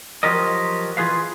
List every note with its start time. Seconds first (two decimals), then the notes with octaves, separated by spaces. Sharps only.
0.23 F3 F#3 F4 G4 A#4 D#5
0.97 E3 F4 G#4 B4 F5